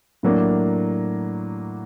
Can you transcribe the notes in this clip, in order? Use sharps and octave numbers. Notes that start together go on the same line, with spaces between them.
A2 F#3 A#3 D4